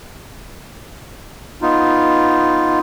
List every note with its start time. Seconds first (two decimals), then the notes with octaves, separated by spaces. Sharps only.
1.62 B3 D#4 F4